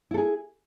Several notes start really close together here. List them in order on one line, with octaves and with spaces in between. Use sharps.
E4 A4 G#4